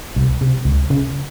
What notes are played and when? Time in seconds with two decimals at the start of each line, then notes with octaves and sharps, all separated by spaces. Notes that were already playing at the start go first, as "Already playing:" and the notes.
0.16 C2
0.41 C3
0.65 C#2
0.90 C#3